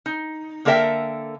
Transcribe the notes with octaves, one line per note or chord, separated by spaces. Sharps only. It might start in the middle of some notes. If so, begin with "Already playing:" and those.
D#4
D3 A#3 A4 A#4 E5 G5